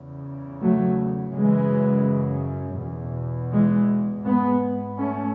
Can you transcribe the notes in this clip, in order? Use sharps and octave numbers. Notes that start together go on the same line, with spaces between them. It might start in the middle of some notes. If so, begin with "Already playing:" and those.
Already playing: E2 C#3
F#3 A3
F#2 C#3 E3 G#3
E2 B2
E3 G#3
G#2 G#3 B3
A3 C#4